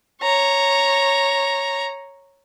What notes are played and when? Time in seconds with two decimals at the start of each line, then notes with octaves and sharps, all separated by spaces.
0.22 C#5 A#5